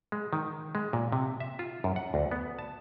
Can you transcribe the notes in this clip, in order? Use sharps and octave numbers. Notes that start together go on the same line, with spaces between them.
G#3
D#3
G#3
A#2
C3
E5
F4
F#2
F#5
D2
B3
A5